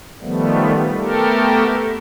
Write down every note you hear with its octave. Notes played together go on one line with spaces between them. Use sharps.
D#3 F3 G3 A3 B3
A3 B3 G4 A4 A#4